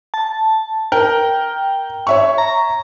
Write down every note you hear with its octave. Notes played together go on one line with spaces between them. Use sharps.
A5
A#4 G5
C#5 E5 C#6
A#5